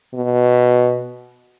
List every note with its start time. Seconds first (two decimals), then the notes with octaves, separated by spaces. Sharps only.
0.14 B2